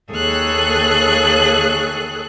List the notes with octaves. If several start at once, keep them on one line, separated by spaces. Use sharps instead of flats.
D#2 G#4 A4 C#5 F#6